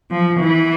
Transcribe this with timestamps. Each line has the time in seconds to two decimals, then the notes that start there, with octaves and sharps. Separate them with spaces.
0.11 F3
0.39 E3